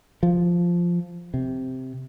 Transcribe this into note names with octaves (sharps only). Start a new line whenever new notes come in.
F3
C3